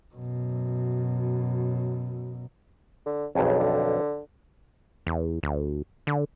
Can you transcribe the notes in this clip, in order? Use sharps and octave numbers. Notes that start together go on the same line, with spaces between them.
F#2 B2
D3
B1 F2 C#3
D3
E2
D2
D3